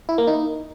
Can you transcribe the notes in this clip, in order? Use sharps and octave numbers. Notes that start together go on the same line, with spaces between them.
E4
A#3
D#4